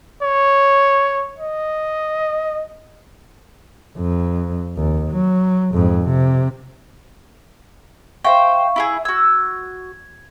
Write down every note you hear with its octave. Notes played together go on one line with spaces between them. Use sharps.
C#5
D#5
F2
D#2
F#3
F2 G#2
C3
C5 E5 F5 G5 C#6
E4 G4 G#4
F#4 E6 G#6